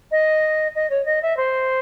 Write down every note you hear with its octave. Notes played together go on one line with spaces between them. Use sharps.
D#5
D#5
C#5
D#5
E5
C5